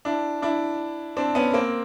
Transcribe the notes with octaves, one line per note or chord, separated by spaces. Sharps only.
D4 E4
D4 E4
C4 D4
B3 C#4
A#3 C4